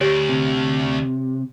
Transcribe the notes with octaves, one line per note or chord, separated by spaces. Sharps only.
D2 G4 C#5 D7
C3